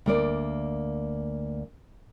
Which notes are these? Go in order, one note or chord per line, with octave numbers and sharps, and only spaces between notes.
D2 A#3 D5